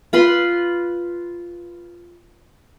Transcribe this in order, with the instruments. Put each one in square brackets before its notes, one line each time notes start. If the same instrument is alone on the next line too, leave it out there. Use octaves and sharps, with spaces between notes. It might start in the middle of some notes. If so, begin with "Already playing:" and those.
[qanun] F4 B4 B5 C6